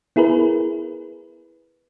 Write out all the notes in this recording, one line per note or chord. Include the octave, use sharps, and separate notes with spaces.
B3 E4 G#4 A#4 B4